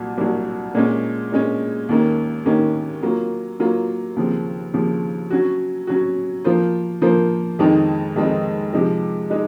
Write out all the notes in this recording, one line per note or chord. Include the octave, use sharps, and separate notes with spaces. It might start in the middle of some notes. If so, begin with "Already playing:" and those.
Already playing: C2 A#2 F#3
C2 A#2 F#3
A#2 G#3 C#4
A#2 G#3 C#4
D#2 D#3 A#3 C#4
D#2 D#3 A#3 C#4
F#3 A#3 F4
F#3 A#3 F4
D#2 C#3 F3 C4
D#2 C#3 F3 C4
F#3 C#4 F#4
F#3 C#4 F#4
F3 A#3 F4 C5
F3 A#3 F4 C5
F2 D#3 G#3 C4 D#4
F2 D#3 G#3 C4 D#4
C3 F3 G#3 D#4
G#3 D#4